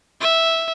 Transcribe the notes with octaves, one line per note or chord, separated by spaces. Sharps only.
E5